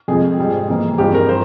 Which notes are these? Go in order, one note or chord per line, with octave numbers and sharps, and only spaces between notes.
F2 C3 F3 G#3 C4 G#4
G#2 G3 C4
F2 E3 A#3
G2 F3 G#3 C4 G4
A#4
C5